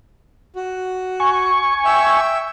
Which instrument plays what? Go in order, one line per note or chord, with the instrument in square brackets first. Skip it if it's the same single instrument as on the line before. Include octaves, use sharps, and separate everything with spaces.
[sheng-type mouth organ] F#4
[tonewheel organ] G#5 C#6
[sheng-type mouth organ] E5 G5 E6